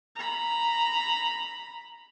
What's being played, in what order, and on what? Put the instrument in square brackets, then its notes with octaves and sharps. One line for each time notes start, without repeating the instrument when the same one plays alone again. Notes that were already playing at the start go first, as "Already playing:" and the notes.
[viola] A#5 B5